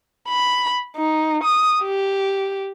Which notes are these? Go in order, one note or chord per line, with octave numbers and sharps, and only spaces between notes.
B5
D#4
D#6
G4